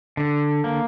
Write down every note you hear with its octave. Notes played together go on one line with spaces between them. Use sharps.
D3
A#3